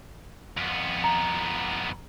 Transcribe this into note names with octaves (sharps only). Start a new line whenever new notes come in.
F2 B3
A#5